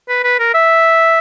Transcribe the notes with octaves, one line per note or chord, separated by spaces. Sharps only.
B4
B4
A#4
E5